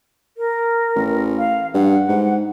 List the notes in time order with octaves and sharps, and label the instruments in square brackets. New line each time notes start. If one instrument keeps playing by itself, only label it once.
[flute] A#4
[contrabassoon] A1
[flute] F5
[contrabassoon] G2 [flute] F#5
[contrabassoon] G#2